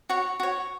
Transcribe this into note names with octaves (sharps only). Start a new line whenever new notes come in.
F#4 C#5
F#4 C#5